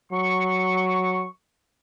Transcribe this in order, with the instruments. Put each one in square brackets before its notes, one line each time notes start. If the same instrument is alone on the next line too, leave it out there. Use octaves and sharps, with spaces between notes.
[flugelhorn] F#3 [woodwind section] C#6